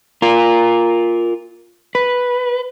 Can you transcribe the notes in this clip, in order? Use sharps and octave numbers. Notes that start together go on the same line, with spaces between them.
F4 A#4
B4